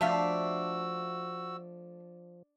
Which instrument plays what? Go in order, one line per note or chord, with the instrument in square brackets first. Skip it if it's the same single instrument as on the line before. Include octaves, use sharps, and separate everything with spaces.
[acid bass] F3 [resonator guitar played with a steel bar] A3 E5 F5 [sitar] D4 [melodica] F#4 E6